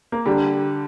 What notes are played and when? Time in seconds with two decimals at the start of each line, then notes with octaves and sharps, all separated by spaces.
0.12 A#3
0.26 D3 G3